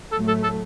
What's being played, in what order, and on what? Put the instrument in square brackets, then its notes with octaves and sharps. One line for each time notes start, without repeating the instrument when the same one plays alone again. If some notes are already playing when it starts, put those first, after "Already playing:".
[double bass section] A2 F#3 A3 [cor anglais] A4
[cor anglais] A4
A4